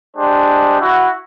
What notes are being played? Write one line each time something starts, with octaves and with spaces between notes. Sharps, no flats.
G#3 D4 G4 C5
E4 F#4